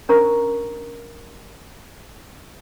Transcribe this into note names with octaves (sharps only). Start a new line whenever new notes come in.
C#4 D4 A#4 C5 A#5 C#6